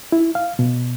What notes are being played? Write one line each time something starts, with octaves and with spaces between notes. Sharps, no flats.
E4
F5
B2